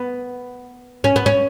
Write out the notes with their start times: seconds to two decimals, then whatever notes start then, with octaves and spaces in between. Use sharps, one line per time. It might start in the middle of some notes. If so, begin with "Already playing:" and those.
Already playing: B3
1.04 C#4
1.16 B3
1.26 C#4